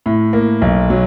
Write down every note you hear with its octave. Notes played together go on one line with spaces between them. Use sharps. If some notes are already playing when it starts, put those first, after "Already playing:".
A2
A#3
B1
F#3